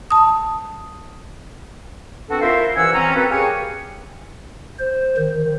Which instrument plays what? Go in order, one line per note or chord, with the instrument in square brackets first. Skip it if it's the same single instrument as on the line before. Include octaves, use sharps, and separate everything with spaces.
[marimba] A5 D#6
[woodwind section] B3 C4 D4 F#4 A4
E4 F4 A#4 C5 E5 F5
C2 E3 C#4 F#5 G#5 E6
C4 C#4 A#5
A#3 C4 F#4 A4 B4
G4 G#4 A#4 C#5 F5 G#5
[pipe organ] C5
D#3